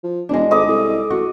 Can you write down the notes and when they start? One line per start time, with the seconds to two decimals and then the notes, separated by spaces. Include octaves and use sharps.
0.04 F3
0.29 E1 G#3 D4
0.51 G#1 A4 D#5 D6
0.67 C2 A4
1.10 A1 F#4